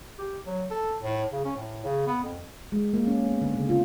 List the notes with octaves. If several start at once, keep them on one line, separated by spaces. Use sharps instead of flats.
G4
F#3
A4
A2
C#3
C#4
A2
C#3
B3
F2
G#3
A#3
C#4
B3
D3
C#3
F4